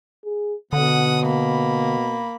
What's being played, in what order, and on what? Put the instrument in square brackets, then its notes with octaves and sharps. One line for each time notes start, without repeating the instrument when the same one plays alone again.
[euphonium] G#4
[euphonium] B2 [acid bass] D3 [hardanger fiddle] F#5 D#6
[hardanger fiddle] A#3 B5